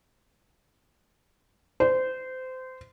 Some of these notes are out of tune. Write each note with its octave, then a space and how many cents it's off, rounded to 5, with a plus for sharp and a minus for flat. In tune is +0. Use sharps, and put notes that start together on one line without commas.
C5 -25